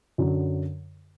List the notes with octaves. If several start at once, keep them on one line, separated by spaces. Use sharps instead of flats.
F#2 D3 F#3